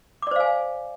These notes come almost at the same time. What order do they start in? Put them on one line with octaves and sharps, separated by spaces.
D6 D5 C5 F5 G#5